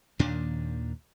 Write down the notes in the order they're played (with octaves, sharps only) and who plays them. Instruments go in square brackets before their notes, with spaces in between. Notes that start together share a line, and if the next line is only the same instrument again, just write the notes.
[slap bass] D#2 A#2 D#3 D4